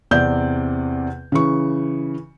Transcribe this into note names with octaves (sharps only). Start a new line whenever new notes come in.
E2 C3 C4 D5 G6
C#3 E3 C#6